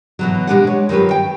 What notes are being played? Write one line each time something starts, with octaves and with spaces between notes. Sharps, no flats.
B2 E3 F#3
G#3 D4 G4 B4 F#5
C#5
D#3 F#3 F4 G4 B4
G5